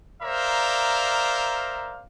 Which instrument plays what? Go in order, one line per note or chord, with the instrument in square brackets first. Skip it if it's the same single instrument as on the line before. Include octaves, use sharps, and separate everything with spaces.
[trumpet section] A#4 C5 D5 E5 F5 A#5